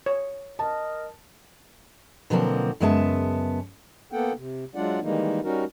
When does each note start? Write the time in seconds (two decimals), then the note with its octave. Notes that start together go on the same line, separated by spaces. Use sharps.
0.06 C#5
0.59 A#4 D#5 A5
2.30 B2 D3 F3 F#3 A#3 C4
2.80 F#2 C#3 G#3 B3 E5 A5
4.12 A#3 B3 A4 F#5 G5
4.36 C3
4.75 F#3 G#3 D4 F4 D5 F#5
5.02 D#3 E3 G3 G#3 A#3 D#4
5.44 G3 C#4 D#4 F#4 A#4